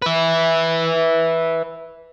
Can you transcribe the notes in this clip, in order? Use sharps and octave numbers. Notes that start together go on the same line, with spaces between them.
B4 E5